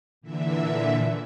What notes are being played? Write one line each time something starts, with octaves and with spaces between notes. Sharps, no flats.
A#2 D3 E3 E5